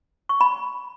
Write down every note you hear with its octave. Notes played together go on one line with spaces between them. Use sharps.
C#6
B5